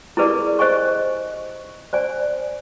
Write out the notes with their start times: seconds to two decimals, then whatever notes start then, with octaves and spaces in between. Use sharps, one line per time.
0.17 E4 G4 G#4 A#4 B4 D5
0.59 C5 D#5 G#5 C#6
1.93 C5 D5 G#5